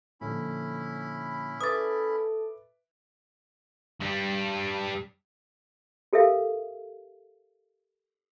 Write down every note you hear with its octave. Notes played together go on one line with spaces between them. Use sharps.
A#2 D3 F3 C#4 E4 B5
A4 B4 E5 D6 D#6 A6
G2 G3
G4 A4 A#4 E5 F5